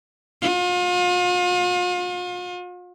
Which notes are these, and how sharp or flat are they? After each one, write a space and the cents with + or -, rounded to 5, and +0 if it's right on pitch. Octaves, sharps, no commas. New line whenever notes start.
F4 +40